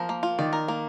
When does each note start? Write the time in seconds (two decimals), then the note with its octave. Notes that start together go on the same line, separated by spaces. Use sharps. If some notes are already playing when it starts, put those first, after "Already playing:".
Already playing: F3 A#4
0.09 A#3
0.23 F4
0.39 D#3 D5
0.53 A#4
0.68 A#3